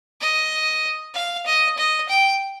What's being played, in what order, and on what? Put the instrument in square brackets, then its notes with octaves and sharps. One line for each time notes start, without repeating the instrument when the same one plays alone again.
[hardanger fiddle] D#5
F5
D#5
D#5
G5